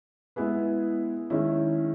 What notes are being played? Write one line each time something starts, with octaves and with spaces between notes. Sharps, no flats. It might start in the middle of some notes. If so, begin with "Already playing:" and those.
G#3 B3 E4 G#4 B4
D#3 G#3 C#4 E4